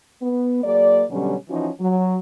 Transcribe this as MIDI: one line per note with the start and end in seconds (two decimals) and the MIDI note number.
0.22 0.62 59
0.64 1.04 54
0.64 1.04 58
0.64 1.04 68
0.64 1.04 74
1.10 1.35 47
1.10 1.35 50
1.10 1.35 54
1.10 1.35 55
1.10 1.35 61
1.50 1.69 52
1.50 1.69 53
1.50 1.69 61
1.50 1.69 63
1.50 1.69 66
1.81 2.18 54